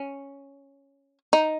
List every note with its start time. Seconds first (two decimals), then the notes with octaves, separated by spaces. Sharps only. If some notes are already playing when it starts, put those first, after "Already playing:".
Already playing: C#4
1.33 D#4